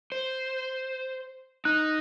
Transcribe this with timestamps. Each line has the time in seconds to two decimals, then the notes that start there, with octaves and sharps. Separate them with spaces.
0.12 C5
1.65 D#4 F#6